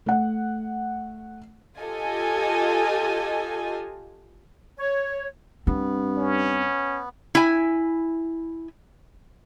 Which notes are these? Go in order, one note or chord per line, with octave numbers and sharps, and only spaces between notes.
A3 F#5
F4 G4 A4 D#5 G#5
C#5
G2 B3 C4
C#4
E4 G#5